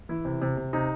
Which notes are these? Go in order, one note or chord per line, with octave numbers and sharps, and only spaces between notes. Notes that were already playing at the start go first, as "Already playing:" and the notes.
E3 E4
C3
C3
C3
C3 D#4